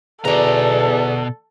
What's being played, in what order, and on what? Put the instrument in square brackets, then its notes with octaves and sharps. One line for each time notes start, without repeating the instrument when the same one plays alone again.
[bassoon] E2 [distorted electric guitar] B2 A#5 [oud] D3 D5 [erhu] A4